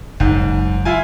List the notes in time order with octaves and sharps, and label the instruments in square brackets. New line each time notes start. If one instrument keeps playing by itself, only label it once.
[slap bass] F#1 [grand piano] G#2
[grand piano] E4 F4 G#5